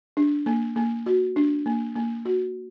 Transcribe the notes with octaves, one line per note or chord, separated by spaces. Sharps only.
D4
A#3
A#3
F#4
D4
A#3
A#3
F#4